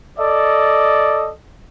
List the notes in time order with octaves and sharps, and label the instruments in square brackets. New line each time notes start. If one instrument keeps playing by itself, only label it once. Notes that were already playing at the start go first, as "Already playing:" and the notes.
[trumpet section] A4 D5 D#5